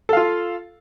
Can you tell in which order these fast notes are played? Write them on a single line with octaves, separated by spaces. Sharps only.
A4 F5 F4